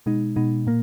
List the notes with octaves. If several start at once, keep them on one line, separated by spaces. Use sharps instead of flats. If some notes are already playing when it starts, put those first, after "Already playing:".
B2 G#3 D#4
B2 G#3 D#4
A#2 A#3